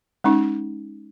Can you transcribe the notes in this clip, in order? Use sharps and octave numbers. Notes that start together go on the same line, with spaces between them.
G#3 C#4 D#4